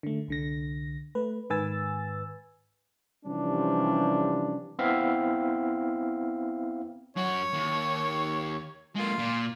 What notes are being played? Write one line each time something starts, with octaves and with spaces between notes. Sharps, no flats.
D3 A3
C2 D3 A#6
A3 B4
G#2 D#3 B4 G#5 E6 A6
C3 E3 F3 G3 C#4 D4
B3 C4 E4 E5 F5
F#2 F#4 C#5
D#2
G#3 A#3 F4
A#2